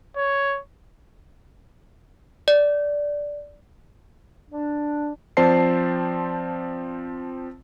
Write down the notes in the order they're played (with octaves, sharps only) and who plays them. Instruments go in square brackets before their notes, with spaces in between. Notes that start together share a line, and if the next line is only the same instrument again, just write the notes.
[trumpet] C#5
[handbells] D5
[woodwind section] D4
[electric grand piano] F3 C4 C5 D5 A5 C7